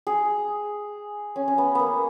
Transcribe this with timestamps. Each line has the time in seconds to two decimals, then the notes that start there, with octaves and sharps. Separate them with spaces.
0.07 G#4
1.36 C#4
1.48 C#4
1.58 B3
1.75 A#3 B3